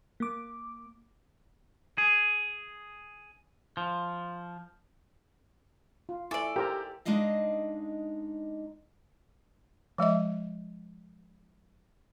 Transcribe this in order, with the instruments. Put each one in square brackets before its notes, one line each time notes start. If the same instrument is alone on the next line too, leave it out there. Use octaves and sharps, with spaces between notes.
[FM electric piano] A#3 D6
[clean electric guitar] G#4
F3
[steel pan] F4
[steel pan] E4 [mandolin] A4 D5 [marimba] G#5 C#6 D6
[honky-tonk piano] G4 [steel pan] A#4 C5 A#5
[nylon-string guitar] G#3 D4 D#4 D#5 F5
[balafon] F3 G#3 D#5 E5